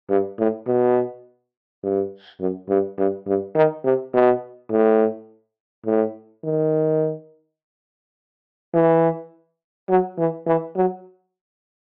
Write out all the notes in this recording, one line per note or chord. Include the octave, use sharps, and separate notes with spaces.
G2
A2
B2
G2
F#2
G2
G2
G2
D#3
C3
B2
A2
A2
D#3
E3
F#3
E3
E3
F#3